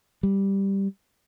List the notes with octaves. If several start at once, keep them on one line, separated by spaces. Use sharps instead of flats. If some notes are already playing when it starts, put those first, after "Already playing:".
G3